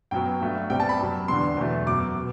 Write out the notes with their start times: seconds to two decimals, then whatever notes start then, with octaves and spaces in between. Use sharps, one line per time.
0.11 F#2 F#3 B3 G5
0.41 G2 F#3 A3
0.70 C3 G3 B3 G5
0.80 A5
0.89 B5
0.99 F#2 F#3 B3
1.28 E2 D3 G3 B3 C6
1.57 E2 B2 F#3 A3
1.86 F#2 F#3 B3 D6
2.16 B2